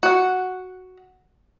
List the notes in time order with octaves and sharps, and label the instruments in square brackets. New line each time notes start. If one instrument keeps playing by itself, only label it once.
[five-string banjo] F#4 F#5